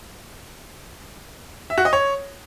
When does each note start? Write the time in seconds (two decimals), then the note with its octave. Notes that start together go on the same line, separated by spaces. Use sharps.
1.70 E5
1.78 F#4
1.85 D#5
1.93 C#5